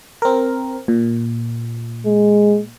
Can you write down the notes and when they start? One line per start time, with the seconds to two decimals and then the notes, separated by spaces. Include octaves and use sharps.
0.22 C4 A#4
0.88 A#2
2.06 G#3